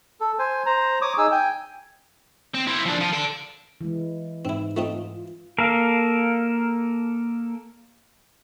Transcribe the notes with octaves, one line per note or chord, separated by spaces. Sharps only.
A4
C5 G#5
C5 A#5
C#5 D6 D#6
D#4 G#4 G#5 E6
G5 G#5
C4
E4 C5
F3 D4
F3
A4 D5
E3 G#3
G#2 C4 E4
A3 C4 D#4 F4
A#3 A4 A#4 F5